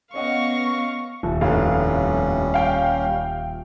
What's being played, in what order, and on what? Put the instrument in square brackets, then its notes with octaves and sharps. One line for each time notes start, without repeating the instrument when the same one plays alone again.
[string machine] B3 A#6 [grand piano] C#4 D#5 F#5 [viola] F5 C#6
[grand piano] D#1
[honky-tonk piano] F1 A2 F5 [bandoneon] G3 C#4
[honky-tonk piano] F5 G5